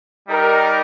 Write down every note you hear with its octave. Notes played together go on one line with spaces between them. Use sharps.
G3 D#4 G4 A#4